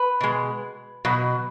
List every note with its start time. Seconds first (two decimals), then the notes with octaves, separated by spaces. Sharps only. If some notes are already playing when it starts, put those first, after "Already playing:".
Already playing: B4
0.21 B2 G#3
1.05 B2 F#3